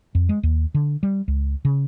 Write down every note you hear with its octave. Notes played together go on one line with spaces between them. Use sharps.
F2
G#3
D#2
D3
G3
C#2
C#3